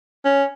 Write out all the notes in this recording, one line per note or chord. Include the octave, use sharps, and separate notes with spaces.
C#4